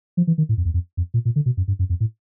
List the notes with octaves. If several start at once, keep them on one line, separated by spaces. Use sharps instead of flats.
F3
E3
D#3
A2
F2
E2
F2
F2
A#2
A#2
D3
B2
F#2
G2
F#2
F2
A2